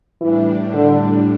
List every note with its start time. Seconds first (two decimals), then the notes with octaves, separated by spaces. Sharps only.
0.20 A2 E3 G3 D4
0.73 D3